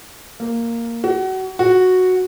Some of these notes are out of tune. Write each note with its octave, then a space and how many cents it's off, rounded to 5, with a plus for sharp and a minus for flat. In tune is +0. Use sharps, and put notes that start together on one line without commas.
A#3 -5
F#4 +30
F#4 -5